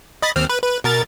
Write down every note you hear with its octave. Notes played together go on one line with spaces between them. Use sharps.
D#5 B5 A6
D#2 C4 F6
B4
B4
B2 A#4 A6